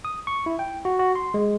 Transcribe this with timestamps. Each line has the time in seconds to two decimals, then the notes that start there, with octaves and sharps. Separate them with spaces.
0.05 D#6
0.27 C#6
0.46 E4
0.59 G5
0.85 F#4
0.99 F#4
1.15 C6
1.34 G#3